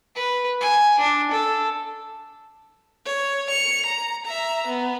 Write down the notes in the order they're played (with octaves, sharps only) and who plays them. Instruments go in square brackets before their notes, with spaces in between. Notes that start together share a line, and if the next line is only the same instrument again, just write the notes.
[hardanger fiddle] B4
G#5
D4
A4
[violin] C#5
C#7 F7
A#5
E5 A#5
B3